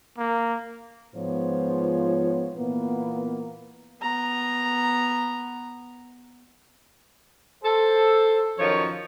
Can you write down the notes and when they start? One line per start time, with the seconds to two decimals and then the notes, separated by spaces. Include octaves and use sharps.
0.18 A#3
1.16 G#2 F3 B3 F4 C5 C#5
2.56 A#2 E3 A#3 B3
4.02 B3 A#5
7.64 A4 C5
8.58 F#2 D#3 F3 C#5